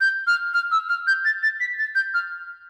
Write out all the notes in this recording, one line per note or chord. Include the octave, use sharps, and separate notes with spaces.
G6
F6
F6
E6
F6
G6
A6
A6
B6
A6
G6
F6